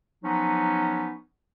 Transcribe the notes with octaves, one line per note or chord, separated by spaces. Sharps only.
F3 F#3 B3 C#4 D#4